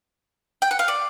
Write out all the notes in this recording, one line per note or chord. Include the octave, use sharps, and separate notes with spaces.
G5
F#5
F5
D5